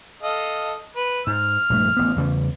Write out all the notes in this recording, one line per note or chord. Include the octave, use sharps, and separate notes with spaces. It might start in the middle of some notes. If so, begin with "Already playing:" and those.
A4 D#5 F5
B4
G#2 F6
A#1 G2 A3
A1 B3
E2 C#3 G3